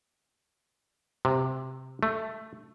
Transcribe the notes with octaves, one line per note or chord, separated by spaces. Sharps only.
C3
A3